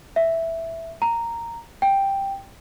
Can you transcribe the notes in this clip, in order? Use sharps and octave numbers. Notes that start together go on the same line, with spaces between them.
E5
A#5
G5